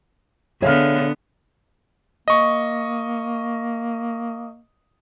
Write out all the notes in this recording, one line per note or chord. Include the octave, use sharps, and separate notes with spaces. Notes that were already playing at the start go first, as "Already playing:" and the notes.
D3 B3 G#4 C#5 E5 F5 F6
A#3 D#5 C#6